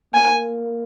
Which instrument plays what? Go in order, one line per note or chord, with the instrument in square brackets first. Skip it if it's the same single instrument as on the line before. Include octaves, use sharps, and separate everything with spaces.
[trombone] A#3 [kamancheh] G#5